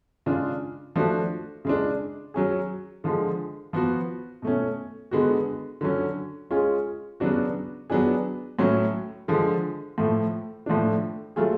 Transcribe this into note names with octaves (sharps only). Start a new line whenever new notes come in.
C#3 G#3 D4 F4
F3 A3 D4 F#4
C#3 G#3 D4
F#3 C#4 G#4
D3 F3 G#3
F3 B3 F#4
B2 A3 C#4
D3 G#3 B3 F#4
D3 F#3 C#4
G#3 C#4 F4 G#4
C#3 F#3 B3 D4 F#4
F#3 B3 D4 G#4
A2 F#3 C#4
D3 F3 G#3
A2 F3 A3
A2 F3 A3 D4
F#3 A3 F4 G#4